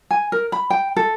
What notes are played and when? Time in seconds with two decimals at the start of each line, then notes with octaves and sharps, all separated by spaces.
0.11 G#5
0.32 A#4
0.52 B5
0.70 G5
0.96 A4